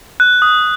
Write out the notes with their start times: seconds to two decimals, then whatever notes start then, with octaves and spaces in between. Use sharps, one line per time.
0.20 F#6
0.42 D#6